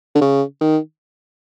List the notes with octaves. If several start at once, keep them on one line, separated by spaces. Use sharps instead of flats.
D3
C#3
D#3